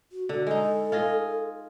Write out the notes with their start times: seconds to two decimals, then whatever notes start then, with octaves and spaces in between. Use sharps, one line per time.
0.12 F#4
0.29 D3 F#4
0.47 G#3 D#4 A4
0.92 F4 G#4 D#5